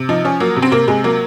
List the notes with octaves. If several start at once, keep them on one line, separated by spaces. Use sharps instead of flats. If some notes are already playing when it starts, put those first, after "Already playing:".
Already playing: C3
F3 D#4
F3 C#4
F#3 A#3
C3
C4
C3 A#3
C3 G#3
F#3 A#3